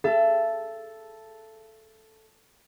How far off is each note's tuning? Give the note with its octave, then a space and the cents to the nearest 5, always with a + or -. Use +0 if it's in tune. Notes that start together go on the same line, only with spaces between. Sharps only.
A4 +0 E5 +40